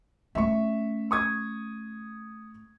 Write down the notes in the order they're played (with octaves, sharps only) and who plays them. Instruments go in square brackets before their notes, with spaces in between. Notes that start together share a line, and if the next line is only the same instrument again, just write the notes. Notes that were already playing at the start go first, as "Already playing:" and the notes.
[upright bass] A3 C#4 [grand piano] E5 C#6
[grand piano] C#6 D#6 G#6